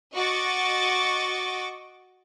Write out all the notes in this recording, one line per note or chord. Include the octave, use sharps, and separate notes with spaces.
F#4 D#5 C#6 D6 A6